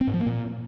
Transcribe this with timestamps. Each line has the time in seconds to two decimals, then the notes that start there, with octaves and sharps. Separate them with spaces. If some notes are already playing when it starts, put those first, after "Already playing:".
0.01 C4
0.07 G#2
0.14 F3
0.20 A#3
0.26 A#2